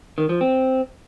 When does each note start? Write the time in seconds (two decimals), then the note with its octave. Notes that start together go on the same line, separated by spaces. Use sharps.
0.18 D#3
0.29 F3
0.41 C4